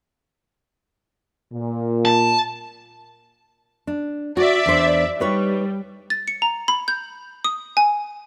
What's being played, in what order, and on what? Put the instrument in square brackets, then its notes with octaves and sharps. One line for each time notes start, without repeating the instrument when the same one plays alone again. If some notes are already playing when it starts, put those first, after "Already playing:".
[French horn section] A#2
[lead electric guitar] A5
[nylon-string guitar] D4
[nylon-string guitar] F#4 [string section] D5 E5
[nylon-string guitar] E2 D4 C5
[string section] G3 [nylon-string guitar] D#4 B4 C#5
[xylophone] A6
C#7
A#5
B5
G6
D#6
G#5